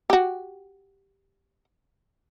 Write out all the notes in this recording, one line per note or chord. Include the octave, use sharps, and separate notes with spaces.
F#4 G4